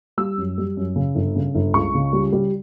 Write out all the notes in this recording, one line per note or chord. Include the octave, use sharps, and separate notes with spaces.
G3 E6
F#2
G3
F#2
C#3
G1
C#3
G1
C#2 C#6
C#3
G3
G3